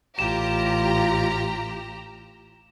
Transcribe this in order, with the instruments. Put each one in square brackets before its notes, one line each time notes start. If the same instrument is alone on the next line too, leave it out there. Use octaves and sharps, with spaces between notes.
[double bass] A1 [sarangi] F4 [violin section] G4 A#5 [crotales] E7